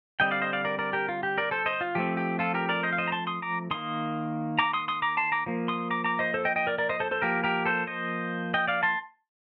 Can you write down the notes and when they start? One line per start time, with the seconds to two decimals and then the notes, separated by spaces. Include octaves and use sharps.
0.20 D3 G3 C4 D#5 G5
0.31 D5 F5
0.42 C5 D#5
0.53 D5 F5
0.65 A#4 D5
0.79 A#4 D5
0.93 G4 A#4
1.09 F4
1.23 G4
1.38 A#4 D5
1.51 A4 C5
1.66 C5 D#5
1.81 F4
1.95 F3 A3 C4 G4
2.17 G4
2.39 F4 A4
2.54 G4 A#4
2.69 A#4 D5
2.83 C5 D#5
2.93 F5
2.98 C5 D#5
3.07 A#5
3.12 A5 C6
3.27 C6 D#6
3.42 A#5 D6
3.71 D#3 A#3 C6 D#6
4.59 A#5 D6
4.73 C6 D#6
4.88 C6 D#6
5.02 A#5 D6
5.17 A5 C6
5.32 A#5 D6
5.46 F3 A#3
5.68 C6 D#6
5.91 A#5 D6
6.04 A#5 D6
6.19 C5 D#5
6.34 A4 C5
6.45 D#5 G5
6.56 D#5 G5
6.67 A#4 D5
6.78 A#4 D5
6.89 C5 D#5
7.00 A4 C5
7.11 A4 C5
7.22 F3 A#3 G4 A#4
7.44 G4 A#4
7.66 A4 C5
7.87 C5 D#5
8.54 D#5 G5
8.68 D5 F5
8.83 A5 C6